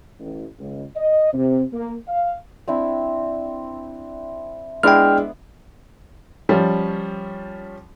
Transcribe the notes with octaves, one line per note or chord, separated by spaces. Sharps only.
A1
C#2
D#5
C3
A#3
F5
C4 D4 E4
G#3 B3 D4 E4 G5 F6
F3 G3 C#4